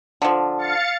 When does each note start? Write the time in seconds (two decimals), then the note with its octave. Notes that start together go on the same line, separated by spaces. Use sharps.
0.22 D3 F3
0.58 F5 A6 C#7